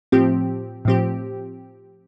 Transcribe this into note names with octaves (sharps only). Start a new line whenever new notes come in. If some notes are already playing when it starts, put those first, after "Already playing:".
A2 F3 C4 G4
A2 F3 C4 G4